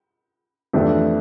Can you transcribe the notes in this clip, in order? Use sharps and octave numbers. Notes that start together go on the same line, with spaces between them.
F2 E3 A3 D4 G4